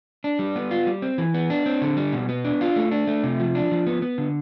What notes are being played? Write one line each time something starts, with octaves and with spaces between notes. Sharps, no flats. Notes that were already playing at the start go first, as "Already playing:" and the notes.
D4
G3
B3
F4
G3
C4
E3
B3
D4
C4
D3
G3
B2
B3
D4
F4
A3
D4
A3
C3
F3
D4
F3
B3
B3
D3